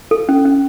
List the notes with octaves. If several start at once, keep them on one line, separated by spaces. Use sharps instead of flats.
A4
C#4
C#4